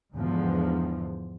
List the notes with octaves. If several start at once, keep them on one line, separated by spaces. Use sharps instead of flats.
E2 G#2 D3 F3